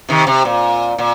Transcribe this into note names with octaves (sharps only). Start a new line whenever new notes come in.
C3 D#3
C3
A#2
A#2